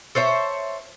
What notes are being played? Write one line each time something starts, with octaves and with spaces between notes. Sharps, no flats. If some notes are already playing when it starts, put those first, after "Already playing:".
A4 C5 C#5 E5